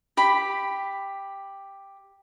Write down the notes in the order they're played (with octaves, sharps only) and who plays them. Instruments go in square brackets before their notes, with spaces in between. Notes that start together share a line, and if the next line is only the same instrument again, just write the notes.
[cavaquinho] G4 B5